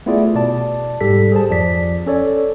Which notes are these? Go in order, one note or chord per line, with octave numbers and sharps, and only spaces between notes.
A3 B3 E4 F4 G#4 D5
B2 D5 A5
G#2 G3 G4 A4 B6
G#4 C5 A5
F2 F3 D5 B6
C#4 A4 C#5 D5